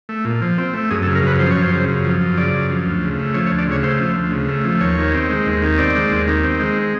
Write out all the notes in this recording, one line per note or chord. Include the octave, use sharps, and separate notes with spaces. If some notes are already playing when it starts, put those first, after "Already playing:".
A3
A#2
F3
C4
A3
F#2 G#4
A4
C#3
A#4
F#2 B4
F3 C5
F#2 C#5
C5
C#3
F#2
F3
F#2
C#3 D5
F#2
F3
D2
C#3
A3
F3 C#5
C#5
D2
D5
C#3 C#5
A3 C5
F3
D2
C#3
A3
F3
D#2 C#5
D#3
C4
G#3
D#2
D#3
C4 D5
G#3
D#2
D#3
C4
G#3